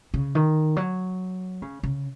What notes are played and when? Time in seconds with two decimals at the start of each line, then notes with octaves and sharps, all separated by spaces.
0.14 C#3
0.35 D#3
0.76 F#3
1.62 C#3
1.83 C#3